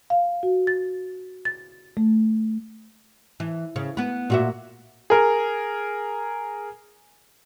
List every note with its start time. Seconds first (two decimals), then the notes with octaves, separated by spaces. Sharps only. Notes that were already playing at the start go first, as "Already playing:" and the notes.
0.10 F5
0.43 F#4
0.67 A6
1.45 A6
1.97 A3
3.40 E3
3.76 C#3
3.97 B3 B4
4.30 A#2 F#4 E5
5.10 G#4 A#4